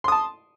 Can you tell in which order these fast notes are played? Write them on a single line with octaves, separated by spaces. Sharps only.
C6 D#6 A5